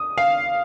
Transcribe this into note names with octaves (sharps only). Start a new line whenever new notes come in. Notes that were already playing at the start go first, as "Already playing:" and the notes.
Already playing: D#6
F5